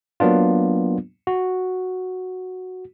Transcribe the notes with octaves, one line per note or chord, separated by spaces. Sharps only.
F#3 A#3 B3 D4 F4
F#4